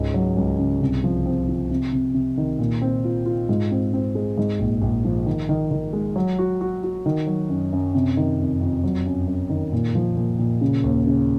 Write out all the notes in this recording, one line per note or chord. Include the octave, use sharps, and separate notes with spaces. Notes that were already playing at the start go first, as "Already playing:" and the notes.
Already playing: C#2 G#2
F#3
C#2
C#3
C2
F3
C4
F3
C3
C3
C3
D#3
A#2
C4
F4
F4
G#2
C4
C4
G#3
G#2
A#1
A#1
F3
D#3
D#3
D#3
G#3
F#3
F#4
F#4
F#4
D#3
F#3
F#2
F#2
C3
D#3
F2
F2
F#3
F#2
F#2
D#3
A#2
F3
A#2
A#2
C#3
D#2
C#3